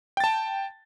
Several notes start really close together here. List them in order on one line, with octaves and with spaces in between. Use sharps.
G5 A6 A5